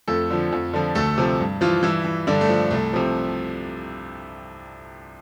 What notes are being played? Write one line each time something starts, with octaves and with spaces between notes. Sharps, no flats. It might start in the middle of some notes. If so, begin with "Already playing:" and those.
F2 A3 A4
D3 F3
F2
D3 F3
D2 A3 A4
C3 F3
G2
E3 F3 F4
G2 E3 E4
E3
G2 D3 D4
A3
F3
C2 A3
C3 F3